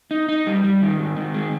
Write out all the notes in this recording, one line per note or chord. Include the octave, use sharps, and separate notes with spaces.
D#4
D#4
G3
G3
D#3
G#2
D#3
G#3